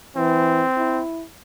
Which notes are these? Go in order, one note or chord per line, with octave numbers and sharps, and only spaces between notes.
E3 C4
E4